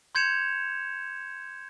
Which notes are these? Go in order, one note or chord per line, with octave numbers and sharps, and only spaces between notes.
C6 G6 G#6 C#7 E7 F7